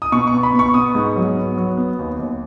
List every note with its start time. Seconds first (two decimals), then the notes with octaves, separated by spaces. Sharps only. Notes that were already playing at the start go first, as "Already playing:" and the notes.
0.02 D#6
0.12 B2 C#6
0.27 B3 C#6
0.43 B5
0.53 B2
0.59 C#6
0.74 B3 D#6
0.95 G#2
1.16 F#3
1.37 B3
1.58 F#3
1.77 B3
1.99 D#2
2.19 D#2